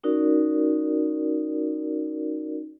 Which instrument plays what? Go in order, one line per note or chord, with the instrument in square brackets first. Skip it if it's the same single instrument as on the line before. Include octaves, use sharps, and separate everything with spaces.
[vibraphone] C#4 D#4 F#4 A#4 D5